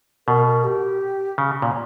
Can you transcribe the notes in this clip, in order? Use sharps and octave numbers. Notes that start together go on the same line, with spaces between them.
B2 A#4
A#4
G4
C#3
A#2